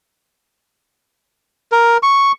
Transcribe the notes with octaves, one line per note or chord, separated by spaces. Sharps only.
A#4
C#6